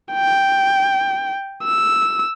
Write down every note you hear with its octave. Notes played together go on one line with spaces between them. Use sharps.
G5
E6